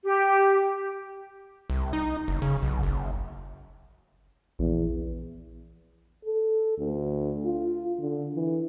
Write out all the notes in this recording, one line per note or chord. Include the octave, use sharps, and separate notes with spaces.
G4
C2
D#4
F#1
C#3
B1
F#1
A#1 E2
A4
D2
F4
D3
E3